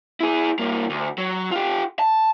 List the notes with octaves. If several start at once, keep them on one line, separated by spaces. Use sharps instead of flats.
E4 G#4
G2 A#3
D2
F#3
F4 G4
A5